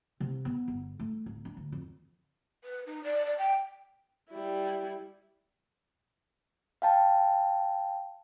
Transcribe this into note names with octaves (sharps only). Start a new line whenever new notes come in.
C3
B3
G1
A3
D1
D4
D2
F2
B4
D#4
D5
D5
G5
G3 E4
F5 G5 A5